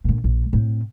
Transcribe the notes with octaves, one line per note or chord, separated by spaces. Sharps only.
A#2 D3
A#1
A2 C4